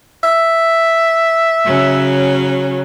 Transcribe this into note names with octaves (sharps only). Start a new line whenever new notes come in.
E5
C#3 F#3 C#4